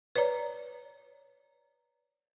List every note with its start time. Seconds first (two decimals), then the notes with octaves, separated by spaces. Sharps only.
0.15 B4 C#5 D5 A#5